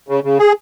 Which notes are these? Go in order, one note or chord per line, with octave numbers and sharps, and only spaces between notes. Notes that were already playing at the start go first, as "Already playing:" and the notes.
C#3
C#3
G#4